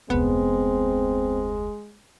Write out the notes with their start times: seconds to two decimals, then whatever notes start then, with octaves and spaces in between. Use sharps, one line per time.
0.10 F1 D2 G#3 B3 C4